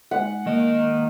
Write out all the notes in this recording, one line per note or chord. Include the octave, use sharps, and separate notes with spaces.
G#3 D#4 F#5
D#3 A#3 D#5